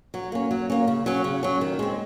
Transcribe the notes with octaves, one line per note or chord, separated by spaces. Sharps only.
F#3
A#3 C#4
F#3
A#3 C#4
C#3
F#3 C#4
C#3
F#3 C#4
D#3
G#3 C4